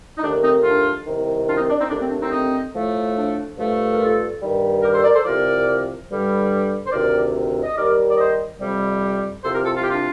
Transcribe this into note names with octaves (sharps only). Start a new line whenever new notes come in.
D#4
D#2 D#3 A3 D4
C4 D#4
D4 F4
C2 C3 D#3
D4 F4
C4 D#4
D4
C4 D#4
D#2 D3 A3 D4
C4
D4
C4 D#4
C4 D#4
A2 F3 A3
D4
G2 F3 A3
A#4
F4 A4
G2 D#3 G3
G4 A#4
A4 C5
A#4 D5
A4 C5
C2 C3 F3 A#4 D5
G2 D3 G3
C5
D2 C3 D#3 A#4 D5
D#5
D#2 D#3 G3 A#4 D5
D5
C5 D#5
F2 C3 G3
C2 C3 F3 A4 C5
G4 A#4
F4 A4
F4
G4
D4 F4